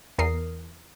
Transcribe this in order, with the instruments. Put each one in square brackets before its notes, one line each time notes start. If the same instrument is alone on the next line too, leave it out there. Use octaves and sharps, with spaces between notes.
[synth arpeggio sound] E2 A#4 D#6 C7